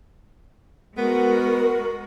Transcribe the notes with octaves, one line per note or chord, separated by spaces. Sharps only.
G#3 B3 F#4 A#4